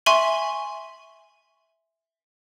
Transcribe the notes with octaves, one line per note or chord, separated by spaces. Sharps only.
E5 G#5 C6 C#6 D#7 F#7